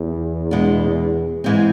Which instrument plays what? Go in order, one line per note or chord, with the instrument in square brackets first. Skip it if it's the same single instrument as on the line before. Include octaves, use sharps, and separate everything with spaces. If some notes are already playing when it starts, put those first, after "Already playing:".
Already playing: [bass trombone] E2
[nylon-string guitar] B2 G#3 B3 D4
G#2 E3 G#3 C4